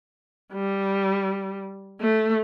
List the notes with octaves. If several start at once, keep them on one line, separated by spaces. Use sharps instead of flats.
G3
A3